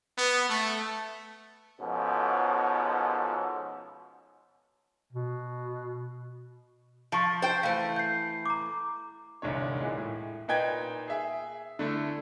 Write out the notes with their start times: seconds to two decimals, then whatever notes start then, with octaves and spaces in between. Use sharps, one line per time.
0.17 B3
0.48 A3
1.81 G#2 B2 F3 C#4 A4
5.13 B2
7.12 F3 A5 C#6
7.42 C5 G5
7.63 E3 A3 F5
7.96 G6 C7
8.46 A#5 D6
9.42 E1 C2 G#2 D3 C#5
9.80 A#2 E3 G#3
9.97 A2
10.48 A#2 D#4 B4 G5 G#6
11.08 G#4 E5 G#5
11.79 D3 A3 E4